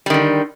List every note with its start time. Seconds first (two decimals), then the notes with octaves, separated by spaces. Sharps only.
0.06 G3
0.10 D#3
0.14 D3